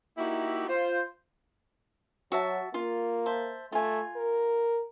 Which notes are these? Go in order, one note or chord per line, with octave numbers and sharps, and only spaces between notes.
A#3 D#4 E4 F#4 G4 E5
F4 C5
F#3 F#4 E5 A5
A#3 F4
C5 E5 A5
A3 F4 G#5
A#4